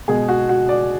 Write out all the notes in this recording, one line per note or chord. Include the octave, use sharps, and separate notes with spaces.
B2 G#3 G#4
F#4
F#4
D5